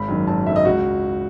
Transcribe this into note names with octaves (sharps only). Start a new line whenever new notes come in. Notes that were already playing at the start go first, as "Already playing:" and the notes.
Already playing: G#1 B5
F#2 D#3
G#1 A5
F#2 D#3 E5
D#5
C#2 F#4